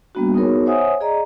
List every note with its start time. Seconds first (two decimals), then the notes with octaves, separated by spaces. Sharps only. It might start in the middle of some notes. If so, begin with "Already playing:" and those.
0.15 G3 A#3 B3 D4 F#4
0.34 B3 D#4 F#4 G#4 A#4 C#5
0.66 C5 C#5 E5 F#5 G#5 D#6
1.01 G#4 D5 D#5 A#5